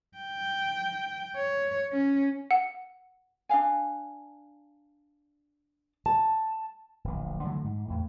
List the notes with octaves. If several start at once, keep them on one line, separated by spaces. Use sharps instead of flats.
G5
C#5
C#4
F#5
D4 G#4 F5 G#5
A5
D1 A#1
D3 E3 F#3 A3
G#2
E2 A2